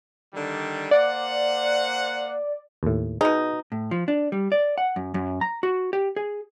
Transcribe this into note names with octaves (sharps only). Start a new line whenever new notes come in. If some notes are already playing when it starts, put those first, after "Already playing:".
D3 D#3 G3
A#3 C5 D5 F#5
D#2 A2
B2 D#4 G#4
A2
F3
D4
G3
D5
F#5
F#2
F#2
A#5
F#4
G4
G#4